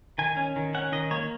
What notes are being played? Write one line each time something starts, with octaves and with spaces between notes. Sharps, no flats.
D#3 G#5
C#4
D#3
C#4 F#5
D#3 D#5
A#3 C#5